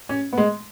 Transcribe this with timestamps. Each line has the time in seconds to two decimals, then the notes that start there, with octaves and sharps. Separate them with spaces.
0.09 C#4
0.33 B3
0.38 G#3